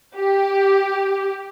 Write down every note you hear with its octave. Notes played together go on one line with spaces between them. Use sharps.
G4